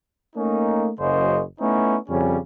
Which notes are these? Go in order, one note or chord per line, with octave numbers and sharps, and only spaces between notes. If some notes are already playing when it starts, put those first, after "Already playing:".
A3 A#3 C#4 D#4
F#1 F#2 C#3 C5 D#5
A3 B3 C#4 D#4 E4
F2 C#3 G3 C#4